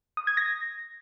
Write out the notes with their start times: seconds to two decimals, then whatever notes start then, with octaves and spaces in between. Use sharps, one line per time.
0.17 D#6
0.27 G#6
0.37 A#6